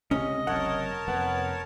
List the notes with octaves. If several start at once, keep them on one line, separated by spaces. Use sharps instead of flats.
C#2 C3 C#4 D#5
F#1 F#2 C3 A#4 C#5 F#5 A5
F1 B3